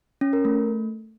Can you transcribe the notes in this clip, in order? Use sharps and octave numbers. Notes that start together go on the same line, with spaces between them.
C#4
A#4
A3